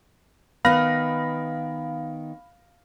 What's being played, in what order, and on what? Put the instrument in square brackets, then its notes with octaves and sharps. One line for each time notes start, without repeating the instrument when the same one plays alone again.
[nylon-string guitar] D#3 B3 [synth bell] F5 [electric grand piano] B5 F6 A#6